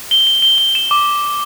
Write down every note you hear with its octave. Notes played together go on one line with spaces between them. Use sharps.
G7
G7
G7
G7
E7
D6